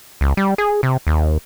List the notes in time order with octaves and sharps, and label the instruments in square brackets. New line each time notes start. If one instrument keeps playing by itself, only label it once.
[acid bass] C#2
G3
G#4
C3
D#2